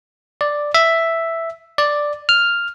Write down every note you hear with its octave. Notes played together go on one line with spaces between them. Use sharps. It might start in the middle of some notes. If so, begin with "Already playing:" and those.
D5
E5
D5
F6